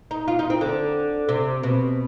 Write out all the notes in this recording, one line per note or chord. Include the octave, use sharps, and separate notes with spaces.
D#4
F4
D#4
C4
D3
C3
B2